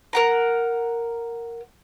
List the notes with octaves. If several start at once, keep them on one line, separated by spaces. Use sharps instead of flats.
A#4 F#5 A#5